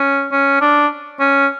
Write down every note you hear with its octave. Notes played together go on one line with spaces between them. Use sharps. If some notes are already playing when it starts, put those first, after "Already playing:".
Already playing: C#4
C#4
D4
C#4